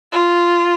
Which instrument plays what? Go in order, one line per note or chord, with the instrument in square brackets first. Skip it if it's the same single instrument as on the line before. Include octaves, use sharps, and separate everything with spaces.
[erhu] F4